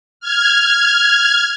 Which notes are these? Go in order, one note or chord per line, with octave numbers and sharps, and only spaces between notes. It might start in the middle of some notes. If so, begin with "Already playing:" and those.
F6 G#6